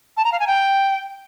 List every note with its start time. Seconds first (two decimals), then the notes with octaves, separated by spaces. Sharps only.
0.17 A5
0.25 A#5
0.32 F5
0.40 G#5
0.47 G5